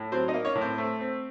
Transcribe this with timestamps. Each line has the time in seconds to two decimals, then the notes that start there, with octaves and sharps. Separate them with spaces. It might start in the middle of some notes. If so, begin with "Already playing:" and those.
Already playing: A2
0.12 F#3 C4 C5
0.28 D#4 D#5
0.34 A#3
0.45 C#4 C#5
0.55 A2
0.61 C4 C5
0.78 A3
1.00 C4